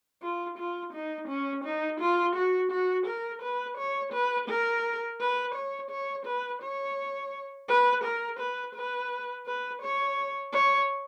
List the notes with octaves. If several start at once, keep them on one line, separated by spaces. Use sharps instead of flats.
F4
F4
D#4
C#4
D#4
F4
F#4
F#4
A#4
B4
C#5
B4
A#4
B4
C#5
C#5
B4
C#5
B4
A#4
B4
B4
B4
C#5
C#5